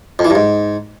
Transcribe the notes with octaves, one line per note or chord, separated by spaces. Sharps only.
F2
E3
G2
G#2